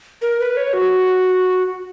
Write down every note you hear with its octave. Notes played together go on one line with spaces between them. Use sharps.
A#4
B4
C#5
F#4